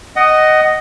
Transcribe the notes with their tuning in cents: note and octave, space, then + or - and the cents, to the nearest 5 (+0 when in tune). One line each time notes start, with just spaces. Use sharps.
D#5 +0 F#5 +20